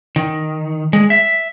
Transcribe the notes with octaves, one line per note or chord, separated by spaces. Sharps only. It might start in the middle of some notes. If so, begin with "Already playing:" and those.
D#3
G#3
E5